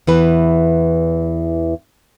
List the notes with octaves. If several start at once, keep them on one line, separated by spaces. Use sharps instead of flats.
E2 E3 B4